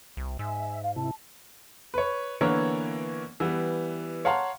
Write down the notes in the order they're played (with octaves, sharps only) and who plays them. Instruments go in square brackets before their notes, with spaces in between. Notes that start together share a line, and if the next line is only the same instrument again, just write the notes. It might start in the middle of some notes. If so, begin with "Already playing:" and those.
[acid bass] C2
[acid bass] G#2 [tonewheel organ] E5 [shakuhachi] G#5
[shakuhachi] F5
[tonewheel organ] C3 E4 [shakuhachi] A5
[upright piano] B4 C#5
D3 E3 A#3 B3 A#4 C#5
E3 G3 B3
C#5 F5 F#5 A5 A#5 C6